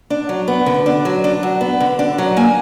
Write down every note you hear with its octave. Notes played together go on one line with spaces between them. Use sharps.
D4
F#3
B3
D3
D4
F#3
D4
F#3
B3
D3
D4
F#3
A#3 G#5